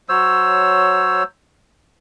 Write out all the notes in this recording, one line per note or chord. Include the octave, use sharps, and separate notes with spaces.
F#3 C5 C#5 E6